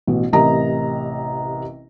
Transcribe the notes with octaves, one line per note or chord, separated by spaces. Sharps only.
A1 B2
A1 C3 A#4 D#5 A#5